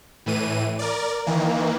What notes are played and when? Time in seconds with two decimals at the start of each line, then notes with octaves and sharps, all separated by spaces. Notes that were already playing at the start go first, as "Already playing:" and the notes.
0.26 A2 E3 D#7
0.79 A#4 D5
1.27 D#3 E3 A#3